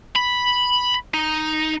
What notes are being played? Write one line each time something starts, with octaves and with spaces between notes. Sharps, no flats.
B5
D#4